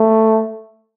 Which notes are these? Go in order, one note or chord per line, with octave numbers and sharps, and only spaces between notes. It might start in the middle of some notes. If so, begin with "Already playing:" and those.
Already playing: A3